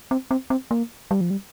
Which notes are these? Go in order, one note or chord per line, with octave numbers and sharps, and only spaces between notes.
C4
C4
C4
A#3
G3
F3
G3